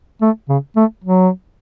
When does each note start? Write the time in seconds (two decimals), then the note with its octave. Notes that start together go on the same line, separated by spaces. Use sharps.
0.22 A3
0.49 C#3
0.76 A3
1.04 F#3